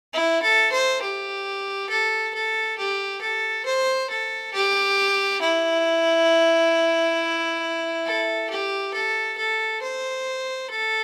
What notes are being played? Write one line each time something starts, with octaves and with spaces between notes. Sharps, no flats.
E4
A4
C5
G4
A4
A4
G4
A4
C5
A4
G4
E4
A4
G4
A4
A4
C5
A4